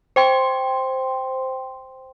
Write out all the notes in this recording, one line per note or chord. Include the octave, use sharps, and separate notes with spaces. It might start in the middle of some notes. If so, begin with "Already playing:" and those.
C5 G5 C6